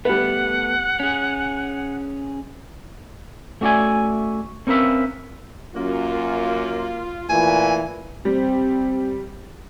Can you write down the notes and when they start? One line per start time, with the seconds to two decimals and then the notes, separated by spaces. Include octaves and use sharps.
0.05 G3 A3 B3 B4 F#5
1.00 C#4 G#4
3.61 A3 C#4 F#4 D5 E5 G#5
4.67 C4 C#4 A#4 B4 E5 F5
5.76 F#2 A#3 F4
7.29 A#2 E3 A3 G#5
8.25 G3 C4